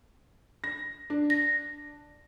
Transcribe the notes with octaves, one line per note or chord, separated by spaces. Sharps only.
A#6
D4
A#6